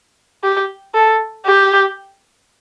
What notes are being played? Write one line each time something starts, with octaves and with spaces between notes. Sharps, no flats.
G4
A4
G4